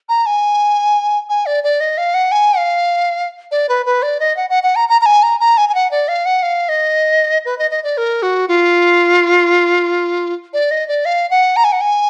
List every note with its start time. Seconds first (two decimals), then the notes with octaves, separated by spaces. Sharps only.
0.09 A#5
0.26 G#5
1.29 G#5
1.46 D5
1.64 D5
1.81 D#5
1.98 F5
2.14 F#5
2.32 G#5
2.57 F5
3.51 D5
3.69 B4
3.86 B4
4.03 D5
4.20 D#5
4.37 F#5
4.50 F#5
4.63 F#5
4.76 A#5
4.89 A#5
5.01 A#5
5.06 G#5
5.23 A#5
5.40 A#5
5.57 G#5
5.69 G#5
5.75 F#5
5.91 D5
6.08 F5
6.25 F#5
6.43 F5
6.69 D#5
7.45 B4
7.59 D#5
7.71 D#5
7.84 D5
7.97 A#4
8.23 F#4
8.48 F4
10.54 D5
10.71 D#5
10.88 D5
11.05 F5
11.30 F#5
11.56 A#5
11.64 G#5
11.72 F#5
11.81 G#5